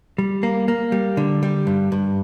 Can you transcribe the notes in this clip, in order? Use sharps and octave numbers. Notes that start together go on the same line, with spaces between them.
G3
A#3
A#3
G3
D3
G3
G2
G2